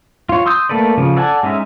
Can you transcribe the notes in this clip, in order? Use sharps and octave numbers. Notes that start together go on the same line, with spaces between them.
F4 C#5
C6 D#6 E6 G6
A3 A#3 A4 B4 D5
C#3 F3
A4 D5 F#5 G#5
G#3 C#4 D#4 E5